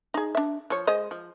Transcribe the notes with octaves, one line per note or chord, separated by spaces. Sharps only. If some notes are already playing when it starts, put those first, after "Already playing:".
D#4 G#4
D4 E5
F3 C#5
G#3 C5 D#5
F3